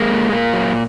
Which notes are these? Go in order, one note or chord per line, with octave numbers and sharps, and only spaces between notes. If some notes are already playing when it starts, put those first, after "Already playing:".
Already playing: G#3 A#3
A#2
A#2 A#3
F#3